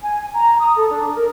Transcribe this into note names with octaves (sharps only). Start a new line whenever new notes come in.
G#5
A#5
D#6
A4
D4
A#4